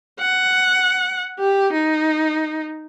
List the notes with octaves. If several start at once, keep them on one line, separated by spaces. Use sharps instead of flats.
F#5
G4
D#4